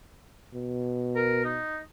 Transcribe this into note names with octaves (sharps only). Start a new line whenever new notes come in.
B2
A#4
D#4